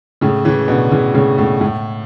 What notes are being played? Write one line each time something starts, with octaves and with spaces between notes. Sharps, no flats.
A2 C#3
C#3 E3
B2 D3
C#3 E3
A2 C#3
A2
A2